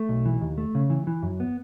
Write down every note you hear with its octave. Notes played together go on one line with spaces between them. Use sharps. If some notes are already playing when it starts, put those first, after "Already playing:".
Already playing: A3
B1
E3
D#2
A3
C#3
E3
E3
F#2
B3